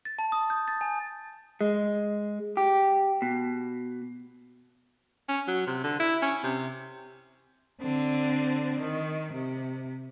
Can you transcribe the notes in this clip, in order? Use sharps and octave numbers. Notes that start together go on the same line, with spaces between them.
A6
A5
D#6
G6
A6
G#5
G#3
G4
B2
C#4
F#3
C3
D3
E4
C#4
C3
D3 C4
D#3
C3